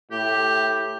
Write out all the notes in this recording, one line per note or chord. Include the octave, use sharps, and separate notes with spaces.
A2 G4